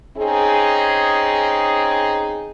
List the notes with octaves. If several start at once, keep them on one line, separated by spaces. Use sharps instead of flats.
C4 C#4 D#4 G#4